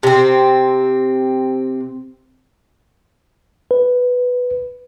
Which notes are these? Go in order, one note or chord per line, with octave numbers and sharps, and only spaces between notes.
C3 C4
B4